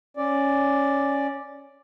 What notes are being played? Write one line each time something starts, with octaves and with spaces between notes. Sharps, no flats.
C#4 D5